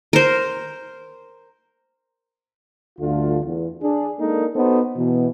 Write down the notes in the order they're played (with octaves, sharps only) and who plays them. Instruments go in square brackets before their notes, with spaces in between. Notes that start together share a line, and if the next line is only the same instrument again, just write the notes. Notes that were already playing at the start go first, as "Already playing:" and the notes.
[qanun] A#4 C5
[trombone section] D2 G2 D3 A3 F4
E2
D4 G#4
G#3 A#3 D4 D#4 A4 A#4
B3 D#4 F#4 A4 C5
B2 E3 B3